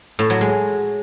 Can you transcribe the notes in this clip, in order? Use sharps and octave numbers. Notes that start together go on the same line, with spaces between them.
A2
F#3
G#3